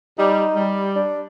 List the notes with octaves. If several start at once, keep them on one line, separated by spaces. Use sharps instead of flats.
G3 D#4
G3
D4